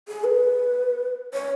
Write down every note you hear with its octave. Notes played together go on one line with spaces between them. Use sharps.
G#4
B4
C#5